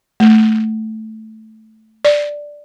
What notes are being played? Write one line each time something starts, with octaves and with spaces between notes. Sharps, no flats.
A3
D5